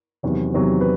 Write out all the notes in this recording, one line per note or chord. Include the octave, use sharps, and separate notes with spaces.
E2 C3 D#3 F#3
E2 C3 D#3 F#3
B4